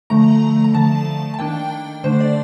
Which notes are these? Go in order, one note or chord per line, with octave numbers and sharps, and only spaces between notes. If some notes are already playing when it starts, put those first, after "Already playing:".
D3 F3 A3 A#5
A#5
D3 F3 A3 A5
A5
D#3 A#3 D4 G5
D3 A3 D4 C5
D5